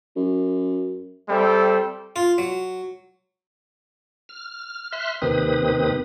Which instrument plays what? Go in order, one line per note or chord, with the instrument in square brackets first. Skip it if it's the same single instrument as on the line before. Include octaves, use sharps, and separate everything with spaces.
[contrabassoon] F#2
[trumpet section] G3 C4 A4 E5 G5
[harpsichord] F4
F#3
[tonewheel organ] F6
E5 C6 F6 F#6
D#2 C3 D#3 C4 B4 D#6